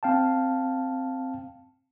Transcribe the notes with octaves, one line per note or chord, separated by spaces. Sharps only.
C4 F5 G5 A5